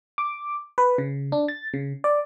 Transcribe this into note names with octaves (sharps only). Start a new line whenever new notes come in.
D6
B4
C#3
D4
A6
C#3
D5